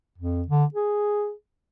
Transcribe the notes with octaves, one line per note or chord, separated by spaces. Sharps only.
F2
D3
G#4